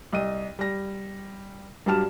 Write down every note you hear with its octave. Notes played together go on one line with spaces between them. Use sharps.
C2 D#5 D#7
G3 A#6
G2 F#3 G3 A5 F6 E7